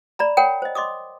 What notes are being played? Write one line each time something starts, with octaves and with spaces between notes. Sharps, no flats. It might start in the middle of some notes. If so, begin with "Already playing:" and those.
D5 A#5 B5
A#4 C#5 F#5 G5 B5
C5 D#5
D#5 C6 D6 D#6